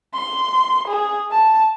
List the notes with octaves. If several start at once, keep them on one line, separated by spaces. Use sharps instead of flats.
C6
G#4
A5